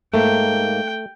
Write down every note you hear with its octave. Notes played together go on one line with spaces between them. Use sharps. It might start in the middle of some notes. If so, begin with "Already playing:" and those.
G#2 A3 A#3 G5